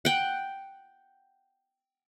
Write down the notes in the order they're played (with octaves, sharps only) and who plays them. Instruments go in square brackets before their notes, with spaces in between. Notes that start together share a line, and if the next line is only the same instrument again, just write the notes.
[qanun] F#5 G5